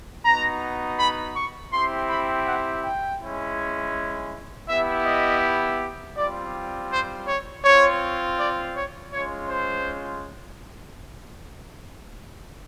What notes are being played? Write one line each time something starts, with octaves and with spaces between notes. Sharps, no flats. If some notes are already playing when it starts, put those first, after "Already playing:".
B3 D#4 F#4 A#5
B5
C#6
C4 E4 G4 C6
B5
F#5
G5
G#3 C#4 E4
B3 E4 G4 E5
D#5
G3 C4 F4 D5
C5
C#5
C4 F4 C#5
D5
C#5
G#3 C#4 F4 C#5
C5